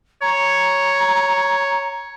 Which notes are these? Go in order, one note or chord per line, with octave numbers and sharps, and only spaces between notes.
C#5 A#5